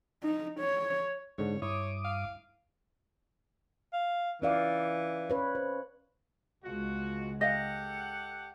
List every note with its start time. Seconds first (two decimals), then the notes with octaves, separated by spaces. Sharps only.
0.23 D#4
0.60 C#5
1.38 G#2 D3 C#5
1.62 G2 E4 C#5 D6 D#6
2.05 F5
3.93 F5
4.42 E3 C#4 D5 F5
5.30 C#4 B4 C#5
5.55 C5
6.64 C#2 B2 G#3 F4 F#4
7.41 G4 A4 D#5 F5 F#5